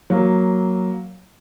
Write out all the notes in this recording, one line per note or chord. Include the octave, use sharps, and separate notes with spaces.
F#3 A#3